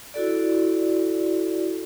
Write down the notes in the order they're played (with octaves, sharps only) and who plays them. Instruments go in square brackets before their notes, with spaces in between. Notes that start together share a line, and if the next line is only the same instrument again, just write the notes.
[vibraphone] E4 F#4 A4 D5